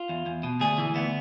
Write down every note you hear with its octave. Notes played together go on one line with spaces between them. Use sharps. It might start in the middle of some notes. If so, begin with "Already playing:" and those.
Already playing: F4
E2
E2
B2
D2 G#4
E3
D2 B3